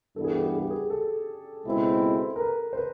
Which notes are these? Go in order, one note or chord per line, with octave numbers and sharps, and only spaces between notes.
G2 E3 G3 B3 A4
G#4
G4
G#4
G#4
G4
G#4
A4
C#2 B2 G#3 C4 E4
A#4
B4
C5
B4